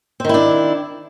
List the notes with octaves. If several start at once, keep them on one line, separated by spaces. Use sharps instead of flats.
D#3 C4 D4 E4